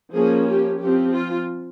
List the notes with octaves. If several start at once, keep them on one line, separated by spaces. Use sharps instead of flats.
F3 A#3 C#4 G#4
G4
F3 C4 G4
F4